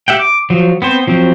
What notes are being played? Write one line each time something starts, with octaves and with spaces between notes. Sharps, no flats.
G4 E5 F#5 G5
D6
F3 F#3
B3 C4 C5
F3 F#3 C4